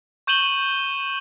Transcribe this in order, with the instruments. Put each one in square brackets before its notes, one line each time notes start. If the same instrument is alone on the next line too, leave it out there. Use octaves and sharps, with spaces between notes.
[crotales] C#6 G6 D#7 E7 F#7 G7